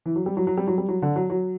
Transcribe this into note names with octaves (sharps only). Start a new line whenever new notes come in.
E3
F#3
G3
F#3
F#3
G3
F#3
G3
F#3
D3
F#3
F#3